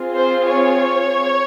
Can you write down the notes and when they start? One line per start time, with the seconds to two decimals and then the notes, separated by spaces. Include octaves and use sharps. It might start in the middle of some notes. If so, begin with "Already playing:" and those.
Already playing: C4 F4 G#4
0.15 C5
0.52 C#5